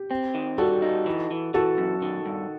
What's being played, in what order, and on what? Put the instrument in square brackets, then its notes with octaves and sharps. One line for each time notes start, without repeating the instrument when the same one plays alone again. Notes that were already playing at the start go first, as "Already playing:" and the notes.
Already playing: [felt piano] G4
[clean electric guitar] C4
D#3
[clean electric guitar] G3 [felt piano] F#4 A4
[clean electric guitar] D#4
E3
E3
[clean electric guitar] E3 [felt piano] F#4 A4
[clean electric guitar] F#2
D#3
G2